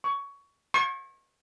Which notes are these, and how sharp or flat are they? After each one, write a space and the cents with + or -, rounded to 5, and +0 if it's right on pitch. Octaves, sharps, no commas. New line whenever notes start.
C#6 +15
C#6 -35